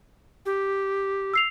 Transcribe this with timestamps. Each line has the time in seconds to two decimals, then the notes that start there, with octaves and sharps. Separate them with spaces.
0.46 G4
1.34 E6 C7 F7